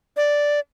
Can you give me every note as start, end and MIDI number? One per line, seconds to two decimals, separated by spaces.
0.17 0.60 74